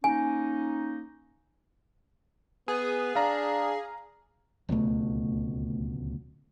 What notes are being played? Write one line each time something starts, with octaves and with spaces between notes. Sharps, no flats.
A#3 C#4 D#4 G#5
B3 G#4
D4 F5 A#5
D1 C#2 B2 A3